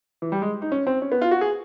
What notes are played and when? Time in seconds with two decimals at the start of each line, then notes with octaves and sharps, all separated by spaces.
0.22 E3
0.32 G3
0.42 G#3
0.62 D#4
0.72 C#4
0.87 C4
1.02 C#4
1.12 B3
1.22 F4
1.31 F#4
1.41 G#4